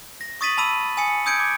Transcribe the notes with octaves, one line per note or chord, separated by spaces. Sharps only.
A#6
C#6 D#6 A6 B6 D#7 F#7
A5 B5 E6 D#7 F#7
G#5 D#6 C#7
D#6 E6 G6 G#6 C#7 D7
D6